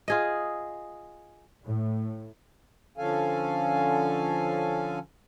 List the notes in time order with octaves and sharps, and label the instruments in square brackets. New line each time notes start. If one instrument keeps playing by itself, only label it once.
[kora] F4 G#4 D#5
[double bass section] A2
[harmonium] D3 F3 C#4 A4 F5 G#5